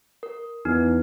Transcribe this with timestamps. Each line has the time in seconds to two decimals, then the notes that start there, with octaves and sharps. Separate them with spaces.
0.23 A#4
0.65 E2 D#4